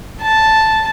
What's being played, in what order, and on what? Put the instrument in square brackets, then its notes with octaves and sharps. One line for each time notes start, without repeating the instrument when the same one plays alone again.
[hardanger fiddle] A5